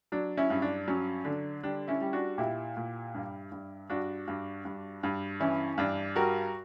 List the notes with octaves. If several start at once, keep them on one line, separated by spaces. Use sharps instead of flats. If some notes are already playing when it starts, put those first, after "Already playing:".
F#3 D4
C#4 E4
G2
D4
F#3 C#4
D3 D4
G3 D4
C#4 E4
G3
D4 F#4
A#2 E4 G4
A#2
G2
G2
G2 D4 F#4
G2
G2
G2
E3 C#4 E4
G2 D4
G3 F#4 A#4